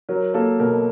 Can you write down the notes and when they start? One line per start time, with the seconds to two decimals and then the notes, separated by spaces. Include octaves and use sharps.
0.09 F#3 A#4
0.34 A#3 A4
0.60 B2 A#4